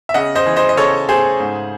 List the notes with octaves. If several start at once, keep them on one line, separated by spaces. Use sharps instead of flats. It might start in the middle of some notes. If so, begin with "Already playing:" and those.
E5
C#3 D#5 F#5
C5 D#5
E3
C5 D#5
D#5
C#3 A4 C#5
A3 G#4 C5
G#2